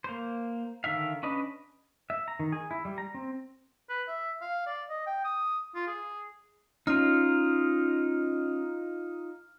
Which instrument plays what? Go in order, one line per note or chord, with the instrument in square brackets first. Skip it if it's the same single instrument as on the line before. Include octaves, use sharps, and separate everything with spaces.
[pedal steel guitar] A#3 C5
D3 D#3 E5 F5
C#4 D4 B4 D#5
E5
A#5
D#3
G#4
E4
G3
A#5
C4
[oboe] B4
E5
F5
D5
D#5
G5
D#6
F4
G#4
[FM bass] C#4 [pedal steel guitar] D#4 F4 [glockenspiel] F6